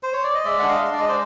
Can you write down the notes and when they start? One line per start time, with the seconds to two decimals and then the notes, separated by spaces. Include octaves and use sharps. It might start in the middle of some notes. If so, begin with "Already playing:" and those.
0.03 C5
0.13 C#5
0.24 D5
0.35 D#5
0.45 G#3 D5 E5
0.59 D4 F#5
0.68 D#5 F5
0.80 G#3
0.93 D5
0.98 G#3 D#5
1.08 C5 D5